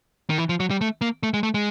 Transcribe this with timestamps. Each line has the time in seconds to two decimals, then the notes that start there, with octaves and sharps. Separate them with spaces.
0.30 D#3
0.38 E3
0.49 F3
0.60 F#3
0.71 G3
0.81 A3
1.01 A#3
1.23 A3
1.34 G#3
1.43 A3
1.54 G#3